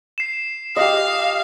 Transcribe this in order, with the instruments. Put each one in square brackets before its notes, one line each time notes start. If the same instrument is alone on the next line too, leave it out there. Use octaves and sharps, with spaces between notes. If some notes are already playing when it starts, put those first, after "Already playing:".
[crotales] C7 E7
[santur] G4 D#5 [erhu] F5